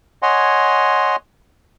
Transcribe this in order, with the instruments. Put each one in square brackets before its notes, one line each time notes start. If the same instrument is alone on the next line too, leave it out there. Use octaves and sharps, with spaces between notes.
[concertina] C#5 D#5 F#5 G#5 C6